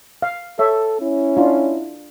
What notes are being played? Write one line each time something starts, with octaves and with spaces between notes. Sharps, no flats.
F5
A4 C#5 E5
C#4 E4
D4 F4